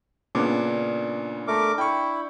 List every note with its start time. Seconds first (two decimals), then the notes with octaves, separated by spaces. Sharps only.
0.35 A#2 C#3 B3 D4
1.48 A3 A#4 D6
1.78 E4 G5 C#6